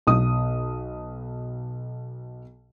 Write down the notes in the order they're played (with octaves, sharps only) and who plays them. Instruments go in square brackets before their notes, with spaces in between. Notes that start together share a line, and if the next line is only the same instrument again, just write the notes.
[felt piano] B1 D#6